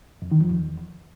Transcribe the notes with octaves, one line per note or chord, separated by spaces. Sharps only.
F2
D#3
F3
E2